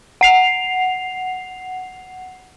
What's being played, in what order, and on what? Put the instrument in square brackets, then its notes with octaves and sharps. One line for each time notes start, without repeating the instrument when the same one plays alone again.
[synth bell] F#5 C7 F7